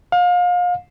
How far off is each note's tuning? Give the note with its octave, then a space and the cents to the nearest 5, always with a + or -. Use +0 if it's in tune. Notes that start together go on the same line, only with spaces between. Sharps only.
F5 +35